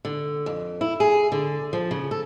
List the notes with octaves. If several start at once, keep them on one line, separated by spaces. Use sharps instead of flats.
D3
F2
E4
G#4
D3
F3
C#3
A4